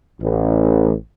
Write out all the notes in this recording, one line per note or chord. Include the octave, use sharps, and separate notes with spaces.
A1